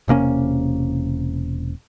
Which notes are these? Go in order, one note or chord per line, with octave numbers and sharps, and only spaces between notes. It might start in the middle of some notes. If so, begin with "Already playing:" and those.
E1 C3 A#3 C#4